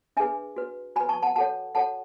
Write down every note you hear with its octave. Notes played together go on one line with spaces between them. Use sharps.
D4 G#4 B4 E5 G#5
F#4 B4
F#4 B4 G#5 B5
A5 C#6
F#5 A5
F#4 A4 C#5 F#5 A5
F#4 A4 C#5 F#5 A5